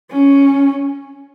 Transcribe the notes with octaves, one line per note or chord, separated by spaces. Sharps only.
C#4